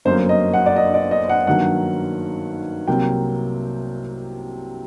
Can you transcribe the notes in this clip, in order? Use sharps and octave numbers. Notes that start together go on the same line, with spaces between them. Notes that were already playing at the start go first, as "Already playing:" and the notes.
G1 F#2 F#3 A#3 C5
D#5
F#5
D5
D#5
D5
D#5
F#5
G2 D#3 F#3 A#3 F#5
C2 C3 F#3 A#3 G5